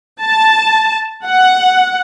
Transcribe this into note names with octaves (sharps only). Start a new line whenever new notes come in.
A5
F#5